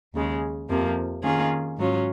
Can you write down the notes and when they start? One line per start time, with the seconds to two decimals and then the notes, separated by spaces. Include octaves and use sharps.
0.14 D#2 C#3 G#3
0.69 F2 C3 F3 A#3
1.22 D#3 A#3 C#4 F4 G#4
1.77 G#2 F#3 C#4 F4